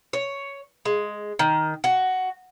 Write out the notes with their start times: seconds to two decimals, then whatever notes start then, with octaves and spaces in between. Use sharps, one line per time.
0.13 C#5
0.85 G#3
1.39 D#3
1.84 F#4